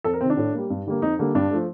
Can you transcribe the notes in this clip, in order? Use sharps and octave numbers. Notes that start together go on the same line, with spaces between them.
F2 A4
A#4
C3 D#3 C4
D4
A2
G3 A#3
G2
D3 G3 A#3
F2 D#4
D3 G3 A#3
G2 D4
F3 A3